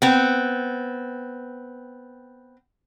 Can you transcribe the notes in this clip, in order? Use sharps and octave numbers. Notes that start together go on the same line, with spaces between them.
B3 C4